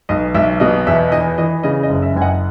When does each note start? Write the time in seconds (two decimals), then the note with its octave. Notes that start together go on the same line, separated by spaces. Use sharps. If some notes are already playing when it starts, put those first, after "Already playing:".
0.09 B1 D#5
0.35 B1 E5
0.60 B2 D#5
0.87 E2 E5
1.12 E3 D#5
1.38 E3 D#5
1.63 C#3 D#5
1.83 D#5
1.89 F#1
2.02 E5
2.15 F#1 G#5
2.22 D#5 F#5